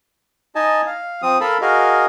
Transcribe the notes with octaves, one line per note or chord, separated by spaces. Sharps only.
D#4 D#5 G#5 A5
F5
F3 C4 D#6
A4 A#4 F5 A5 B5
F#4 G#4 A#4 D#5 F5